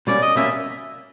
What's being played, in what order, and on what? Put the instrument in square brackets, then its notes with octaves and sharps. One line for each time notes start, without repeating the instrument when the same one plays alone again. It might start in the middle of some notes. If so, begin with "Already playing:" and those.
[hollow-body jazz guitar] B2 G3 A#3 C#4 [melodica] D5
[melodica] D#5
[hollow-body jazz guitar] B2 G3 A#3 C#4 [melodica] E5